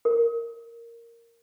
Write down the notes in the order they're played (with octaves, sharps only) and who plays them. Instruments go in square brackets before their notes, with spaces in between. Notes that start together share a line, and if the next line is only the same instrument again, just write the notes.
[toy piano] A#4